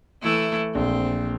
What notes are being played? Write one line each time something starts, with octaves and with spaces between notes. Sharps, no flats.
E3 A3 E4
A#1 C4